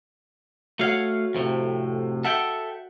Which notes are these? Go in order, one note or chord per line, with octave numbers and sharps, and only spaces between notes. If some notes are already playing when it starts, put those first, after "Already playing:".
A3 F#4 C#5 F5 F#5
F2 A2 C3
A4 E5 F#5 G5